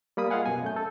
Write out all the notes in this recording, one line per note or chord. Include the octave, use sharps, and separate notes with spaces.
G3 A#3 B5 D#6
F4 G#4 D#5 F5 F#5 G#5
F#2 B2 G#5
F#2 A3 G6
A4